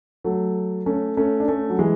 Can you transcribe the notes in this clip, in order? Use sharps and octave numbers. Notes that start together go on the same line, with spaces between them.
F#3 A3
A3 C#4
A3 C#4
D4
A3 C#4
F#3
E3 G#3